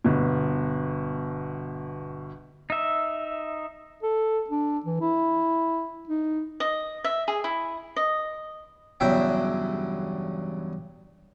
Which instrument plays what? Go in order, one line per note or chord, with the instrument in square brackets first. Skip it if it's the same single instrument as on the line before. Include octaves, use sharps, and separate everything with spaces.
[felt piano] G1 B2
[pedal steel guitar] D#4 E5
[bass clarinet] A4
D4
E3
E4
D#4
[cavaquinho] D#5
E5
G#4
E4
D#5
[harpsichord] E2 G2 C#3 F#3 E5 G5